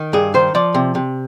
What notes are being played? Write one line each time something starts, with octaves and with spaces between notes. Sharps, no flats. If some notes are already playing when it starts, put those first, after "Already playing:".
Already playing: D#3
G2 G#4
D#3 C5
F3 D5
C3
C3